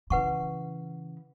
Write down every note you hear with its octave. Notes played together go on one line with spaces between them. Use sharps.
C#3 E3 B4 F#5 C#6